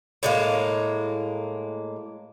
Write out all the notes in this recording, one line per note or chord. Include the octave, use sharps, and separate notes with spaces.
A2 G#3 A#3